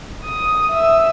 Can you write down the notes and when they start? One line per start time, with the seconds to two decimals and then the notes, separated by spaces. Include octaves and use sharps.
0.24 D#6
0.70 E5 E6